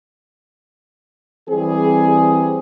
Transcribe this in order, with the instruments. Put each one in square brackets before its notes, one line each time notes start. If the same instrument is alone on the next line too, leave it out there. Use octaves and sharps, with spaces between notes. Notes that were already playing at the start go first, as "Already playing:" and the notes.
[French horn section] E3 G3 C4 G#4